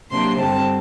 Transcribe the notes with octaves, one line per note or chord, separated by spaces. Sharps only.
C3 F#3 A#3 D4 C6
G2 D3 G3 C4 A5